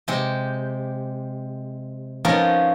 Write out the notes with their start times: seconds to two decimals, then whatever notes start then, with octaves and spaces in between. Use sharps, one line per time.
0.08 C3 G#3 G4
2.25 F3 B3 C#4 D#4 A#4 D5